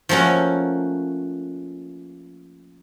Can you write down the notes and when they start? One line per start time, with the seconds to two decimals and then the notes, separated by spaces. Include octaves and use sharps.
0.09 F3 A3 A#3 C#4 F#4